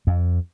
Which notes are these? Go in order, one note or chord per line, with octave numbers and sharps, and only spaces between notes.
F2